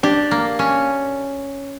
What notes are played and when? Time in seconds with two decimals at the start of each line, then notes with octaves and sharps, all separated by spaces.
0.03 D4 G4
0.31 A#3
0.59 C#4